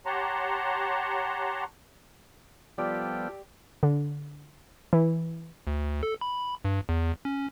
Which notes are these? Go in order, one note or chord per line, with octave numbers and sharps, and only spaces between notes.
G4 C#5 F#5 A5 A#5 C6
F3 G3 B3 F4 G4 A4 D5 G5
D3
E3
D2
A4
B5
G2
E2
C#4